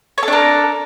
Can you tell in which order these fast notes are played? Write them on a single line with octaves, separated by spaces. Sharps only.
C#5 A4 D4 A#4